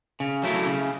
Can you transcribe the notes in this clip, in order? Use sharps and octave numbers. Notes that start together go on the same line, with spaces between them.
C#3
F#3 A3 E4
C#3